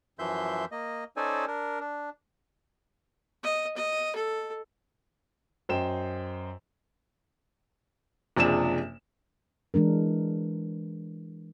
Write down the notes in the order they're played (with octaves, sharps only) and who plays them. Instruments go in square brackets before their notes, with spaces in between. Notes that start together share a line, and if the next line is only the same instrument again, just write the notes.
[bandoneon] F#2 E3 F3 E5 C6 G6
A#3 D#5
C#4 D#4 A4 C5 D5 G#5
D4 A#4
D4
[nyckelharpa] D#5
D#5
A4
[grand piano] F#2 C5 D#5 G5 E7
[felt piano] F#1 C3 F3 D4 G#4 E7
[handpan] E3 G#3 D4 A#4